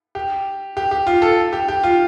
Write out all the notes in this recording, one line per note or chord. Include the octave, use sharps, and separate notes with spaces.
G4
G4
G4
F4
A4
G4
G4
F4